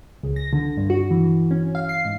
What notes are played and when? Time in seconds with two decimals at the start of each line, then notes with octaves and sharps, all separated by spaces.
0.23 C#2
0.36 A#6
0.53 D3
0.77 G2
0.90 F#4
1.11 E3
1.51 C#4
1.75 F5
1.89 C7
2.05 G#2